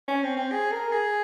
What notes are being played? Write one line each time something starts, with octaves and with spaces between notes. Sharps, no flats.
C#4
C4
C4
G#4
A#4
G#4